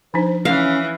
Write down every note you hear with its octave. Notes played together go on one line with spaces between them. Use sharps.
F3 D4 D#4 C5
E3 C#4 F5